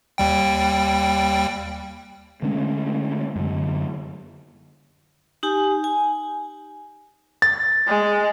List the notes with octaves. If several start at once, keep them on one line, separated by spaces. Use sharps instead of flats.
D#2 G3 G5
D3 G#3 A3 C#4
F#2 D3
D#4 G4 G#5
G#5
A6
G#3